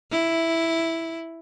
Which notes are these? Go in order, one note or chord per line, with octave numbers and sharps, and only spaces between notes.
E4